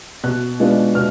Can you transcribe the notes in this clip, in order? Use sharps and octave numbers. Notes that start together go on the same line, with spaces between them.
B2 F#6
G#3 B3 D4 F4
B2 F6